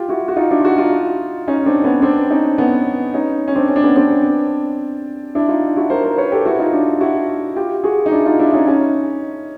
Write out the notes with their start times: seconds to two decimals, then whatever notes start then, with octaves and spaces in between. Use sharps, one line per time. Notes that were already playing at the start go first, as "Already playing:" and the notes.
Already playing: F4 G4
0.09 E4 F#4
0.28 F#4
0.36 D#4 F4
0.51 D4 E4
0.60 F4
0.65 E4 F#4
0.78 D#4 F4
1.47 C#4 D#4
1.66 C4 D4
1.84 B3 C#4
2.02 C4 D4
2.30 C#4 D#4
2.58 B3 C#4
3.14 C#4 D#4
3.48 C#4
3.55 C4 D4
3.69 C#4
3.76 D4
3.83 B3 C#4
3.96 C4 D4
5.35 D4 E4
5.48 D#4 F4
5.76 E4 F#4
5.90 A#4 C5
6.04 A#4 C5
6.17 B4 C#5
6.32 G4 A4
6.46 E4 F#4
6.59 D#4 F4
6.73 D4 E4
7.01 E4 F#4
7.56 F4 G4
7.84 F#4 G#4
8.06 D#4
8.12 D4 E4
8.26 D#4 F4
8.39 D4 E4
8.53 C#4 D#4
8.67 C#4 D#4